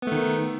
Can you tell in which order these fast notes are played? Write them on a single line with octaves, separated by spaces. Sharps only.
B3 A3 D#3